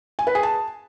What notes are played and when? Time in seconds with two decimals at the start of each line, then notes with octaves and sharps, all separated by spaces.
0.19 G#5
0.27 B4
0.35 G#4
0.43 A5